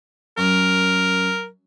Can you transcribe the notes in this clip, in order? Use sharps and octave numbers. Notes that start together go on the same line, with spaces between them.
F#2 A#4